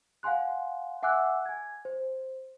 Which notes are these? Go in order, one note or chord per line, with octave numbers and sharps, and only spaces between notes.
F5 F#5 G#5 C6 F#6
E5 F#5 G#5 D6 E6 F#6
G#5 G#6
C5